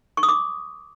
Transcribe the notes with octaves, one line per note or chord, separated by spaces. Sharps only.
C#6
D#6
D6